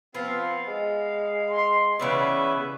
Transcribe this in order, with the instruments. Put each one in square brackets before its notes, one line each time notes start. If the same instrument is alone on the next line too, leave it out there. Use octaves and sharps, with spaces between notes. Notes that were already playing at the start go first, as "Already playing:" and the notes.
[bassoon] F3 [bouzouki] B3 [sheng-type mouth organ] C4 F4 F5
[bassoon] G#3 [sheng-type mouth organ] F5
[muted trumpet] C6
[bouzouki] C#3 E3 D5 [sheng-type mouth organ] B3 C#4 E5 [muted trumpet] B4